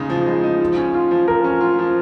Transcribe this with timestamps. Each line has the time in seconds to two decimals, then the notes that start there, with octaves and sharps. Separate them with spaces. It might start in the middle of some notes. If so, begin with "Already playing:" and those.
Already playing: C#3 G#3 D#4
0.10 F3
0.27 G#3
0.44 D#4
0.60 F3
0.77 C#4
0.94 F4
1.11 F3
1.27 F3 A#4
1.44 C#4
1.61 F4
1.79 F3